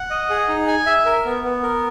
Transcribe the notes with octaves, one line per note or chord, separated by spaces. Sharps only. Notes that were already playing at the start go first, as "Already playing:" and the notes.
Already playing: F#5
D#5
G#4
D#4
G#5
E5
A#4
B3
B3
A#4